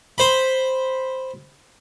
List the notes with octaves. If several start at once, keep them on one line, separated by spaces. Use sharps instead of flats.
C5 B5